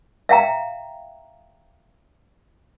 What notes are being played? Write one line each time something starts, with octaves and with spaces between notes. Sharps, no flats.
E5 F5 G5 A#5